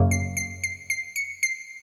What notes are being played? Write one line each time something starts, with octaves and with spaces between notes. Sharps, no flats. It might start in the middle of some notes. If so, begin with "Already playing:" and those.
Already playing: F#2 C#3 F#3 A#3
C7
C7
C7
C7
C#7
C7